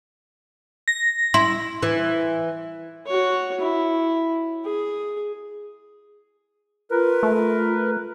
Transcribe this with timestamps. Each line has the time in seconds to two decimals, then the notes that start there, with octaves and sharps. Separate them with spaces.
0.88 A#6
1.34 E4 C6
1.83 E3
3.06 F#4 C#5
3.60 E4
4.65 G#4
6.91 F4 A#4 B4
7.23 A3